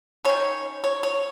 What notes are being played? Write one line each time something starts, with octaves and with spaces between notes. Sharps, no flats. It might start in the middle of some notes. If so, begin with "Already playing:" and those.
D#3 C#4 C#5
C#5
C#5